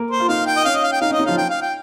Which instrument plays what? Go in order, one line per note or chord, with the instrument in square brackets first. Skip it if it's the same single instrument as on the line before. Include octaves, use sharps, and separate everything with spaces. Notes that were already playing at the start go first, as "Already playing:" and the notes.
Already playing: [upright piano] A#3 A#4
[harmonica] C5
[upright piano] F4
[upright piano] D#4 [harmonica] F5
[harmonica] G5
D#5
[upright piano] C#4 [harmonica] F5
[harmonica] D#5
F5
G5
[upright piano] D#4 [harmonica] F5
[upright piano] C#4 [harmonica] D#5
[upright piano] D#4
[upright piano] F3 F4 [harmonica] F5
[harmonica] G5
F5
G5